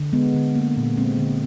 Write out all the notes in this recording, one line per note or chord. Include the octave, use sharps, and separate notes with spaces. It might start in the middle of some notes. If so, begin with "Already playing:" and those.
Already playing: D3
G#3 B3
D3
A#3
A#2
G#3 C4
D3